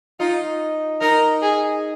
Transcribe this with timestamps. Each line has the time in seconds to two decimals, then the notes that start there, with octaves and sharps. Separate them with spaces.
0.20 D#4 F4
1.01 D#4 A#4
1.42 G#4